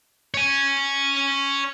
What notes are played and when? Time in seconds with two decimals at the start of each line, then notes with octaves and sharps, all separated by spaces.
0.34 C#5 G#5